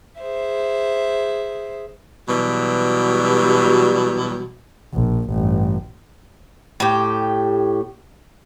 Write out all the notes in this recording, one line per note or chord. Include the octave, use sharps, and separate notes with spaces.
G#4 C5 E5
B2 E3 F#3 G3
A#1
A1 G2
A2 G4